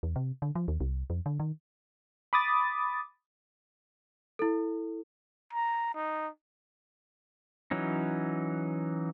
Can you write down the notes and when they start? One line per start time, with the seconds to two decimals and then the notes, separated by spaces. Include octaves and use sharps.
0.03 E2
0.16 C3
0.42 D3
0.55 F3
0.68 D#2
0.80 C2
1.10 F2
1.26 D3
1.40 D#3
2.33 B5 D6 D#6 A6
4.39 E4 A4
5.53 A#5
5.95 D#4
7.71 E3 F#3 C#4 D#4